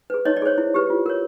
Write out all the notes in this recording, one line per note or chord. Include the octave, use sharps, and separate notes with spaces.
G#4 B4
D#4 C#5 D#5
D5
G#4 C5 C#5
E4
G4 B4
F4
A#4 C#5